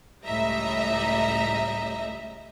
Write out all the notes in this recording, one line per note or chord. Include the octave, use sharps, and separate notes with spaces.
C#2 A2 G3 D#5 E5 A#5